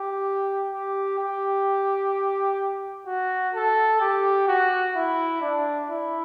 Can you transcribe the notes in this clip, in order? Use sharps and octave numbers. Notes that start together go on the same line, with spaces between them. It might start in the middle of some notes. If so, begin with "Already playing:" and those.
Already playing: G4
G4
G4
F#4
A4
G4
F#4
E4
D4
E4